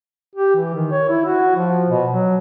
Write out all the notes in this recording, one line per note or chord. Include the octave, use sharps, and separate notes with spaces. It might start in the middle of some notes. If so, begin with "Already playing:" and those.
G4
E3
D#3
C#5
E4
F#4
F3
B2
F#3